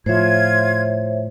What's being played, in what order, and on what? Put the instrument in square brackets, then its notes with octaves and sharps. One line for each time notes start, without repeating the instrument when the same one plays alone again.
[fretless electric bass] A2 F3 [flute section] F4 G#6 [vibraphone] C5 C#5 E5